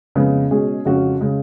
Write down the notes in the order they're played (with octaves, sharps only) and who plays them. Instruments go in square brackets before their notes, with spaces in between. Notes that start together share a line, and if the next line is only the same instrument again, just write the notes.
[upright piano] F2 C#3 G#3 B3
B2 G#3 C#4 G#4
F2 C#3 G#3 C#4 F#4
C#3 G#3